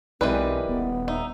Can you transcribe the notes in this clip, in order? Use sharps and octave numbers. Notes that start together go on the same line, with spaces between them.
B1 E3 G#3 C4 G4 A#4 B4 D5
D#1 B3
D#4 E5